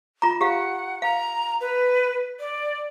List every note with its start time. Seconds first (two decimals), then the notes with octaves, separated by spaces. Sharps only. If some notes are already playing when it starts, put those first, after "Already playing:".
0.22 F4 A#5
0.41 G4 F5 F#5
1.02 F5 A#5
1.61 B4
2.39 D5